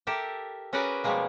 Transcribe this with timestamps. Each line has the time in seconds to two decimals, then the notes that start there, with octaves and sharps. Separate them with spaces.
0.07 G4 A4 A#4 E5
0.73 C#4 F#4 G#4 A#4 B4 D5
1.04 B2 F3 G3 G#3 A#3